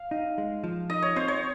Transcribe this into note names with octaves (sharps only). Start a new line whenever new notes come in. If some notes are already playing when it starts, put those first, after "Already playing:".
Already playing: F5
D#4
G#3
F3
D#4 D#5
C#5
C4 C5
C#5